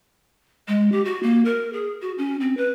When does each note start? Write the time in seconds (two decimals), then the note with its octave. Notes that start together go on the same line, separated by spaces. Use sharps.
0.68 G#3
0.92 G4
1.05 F#4
1.23 A#3
1.45 A#4
1.73 G#4
2.02 F#4
2.18 C#4
2.40 C4
2.57 B4